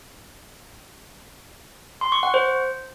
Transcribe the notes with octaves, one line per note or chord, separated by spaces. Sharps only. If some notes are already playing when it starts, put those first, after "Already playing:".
C6
C#6
F#5
C5